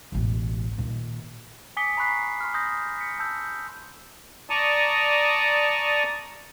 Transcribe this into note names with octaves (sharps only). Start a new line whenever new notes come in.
E1 A1
A#2 D#3
G#5 D6 D#6 B6 C#7 G7
A#5 B5 C#6 F#6 B6 C7
C6 F6
C6 D#6 G6 A#6
B6 C#7
A5 E6 G6
D5 A5 A#5 C#6 D#6